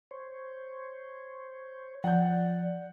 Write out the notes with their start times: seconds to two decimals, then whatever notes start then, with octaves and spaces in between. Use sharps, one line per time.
0.11 C5 C#5
2.04 F3 D5 F#5 G6